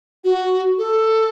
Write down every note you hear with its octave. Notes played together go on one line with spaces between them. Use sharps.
F#4
A4